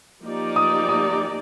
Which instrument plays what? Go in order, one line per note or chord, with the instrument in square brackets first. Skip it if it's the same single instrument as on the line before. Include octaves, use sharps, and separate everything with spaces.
[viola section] F3 A#3 D#4 G4 D5
[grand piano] D#6
D#6